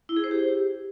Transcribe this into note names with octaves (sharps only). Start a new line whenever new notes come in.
E4
G#4
C5
G4